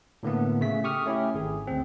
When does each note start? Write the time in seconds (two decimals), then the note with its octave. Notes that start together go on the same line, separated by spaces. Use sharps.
0.23 A2 D3 A#3 B3
0.61 C#3 A3 B6
0.84 G4 C#6 D#6 F6
1.06 A3 C#4 E4 G4
1.34 G#1 G#4
1.67 D2 C4